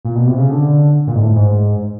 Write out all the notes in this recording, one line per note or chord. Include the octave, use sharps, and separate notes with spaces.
A#2
B2
C3
C#3
D3
A#2
G#2
A2
G#2